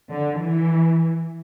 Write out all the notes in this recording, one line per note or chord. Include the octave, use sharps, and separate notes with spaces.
D3
E3